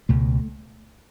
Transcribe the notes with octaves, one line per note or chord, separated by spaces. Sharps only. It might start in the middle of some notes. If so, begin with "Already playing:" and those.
C#2 B2 A3